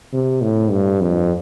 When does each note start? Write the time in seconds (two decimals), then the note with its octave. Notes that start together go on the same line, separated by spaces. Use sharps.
0.13 C3
0.42 A2
0.71 G2
1.01 F2